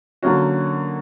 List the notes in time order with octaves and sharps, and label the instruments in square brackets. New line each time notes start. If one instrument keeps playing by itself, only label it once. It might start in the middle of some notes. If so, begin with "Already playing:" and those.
[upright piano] D3 F#3 A#3 C#4 F#4